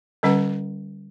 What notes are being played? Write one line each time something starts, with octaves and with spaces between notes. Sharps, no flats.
D3 G3 C#4 B4 F#5